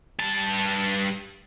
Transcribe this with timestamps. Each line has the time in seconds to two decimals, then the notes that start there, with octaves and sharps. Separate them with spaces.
0.19 G2 A5